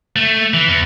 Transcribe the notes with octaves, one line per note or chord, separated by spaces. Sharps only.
A3
E3
E2